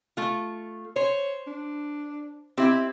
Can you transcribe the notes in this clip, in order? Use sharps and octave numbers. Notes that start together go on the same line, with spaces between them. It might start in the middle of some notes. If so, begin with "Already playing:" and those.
A3 F4
C5 C#5
D4
C4 E4 G4